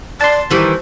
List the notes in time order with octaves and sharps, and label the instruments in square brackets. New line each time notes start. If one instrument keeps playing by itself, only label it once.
[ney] D5 [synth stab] A5 C6
[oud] D#3 E3 G3 [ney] C5